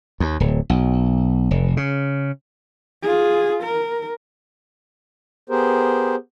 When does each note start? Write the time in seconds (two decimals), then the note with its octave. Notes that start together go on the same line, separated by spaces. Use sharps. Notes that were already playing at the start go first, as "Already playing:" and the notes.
0.20 D#2
0.40 D1
0.70 B1
1.51 F1
1.77 C#3
3.03 F4 G#4
3.63 A#4
5.49 B3 G4 G#4 A#4 C5